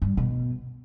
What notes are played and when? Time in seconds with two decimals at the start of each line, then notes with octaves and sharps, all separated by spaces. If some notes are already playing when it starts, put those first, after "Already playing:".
0.02 G2
0.17 B2